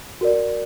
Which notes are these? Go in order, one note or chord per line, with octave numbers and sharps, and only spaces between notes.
F#4 A#4 D5